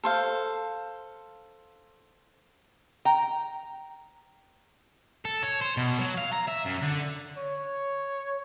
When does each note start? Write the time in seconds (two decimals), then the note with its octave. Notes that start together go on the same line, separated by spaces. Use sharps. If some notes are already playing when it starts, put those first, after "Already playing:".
0.04 A4 C5 F5
3.05 G5 A#5
5.25 A4
5.43 C#5
5.61 C5
5.77 B2
5.99 F#3
6.17 F5
6.32 A#5
6.48 E5
6.65 F#2
6.81 D3
7.38 C#5